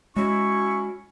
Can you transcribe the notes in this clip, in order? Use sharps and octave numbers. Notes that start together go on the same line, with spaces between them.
G#3 C#4 E4 F#4 C#6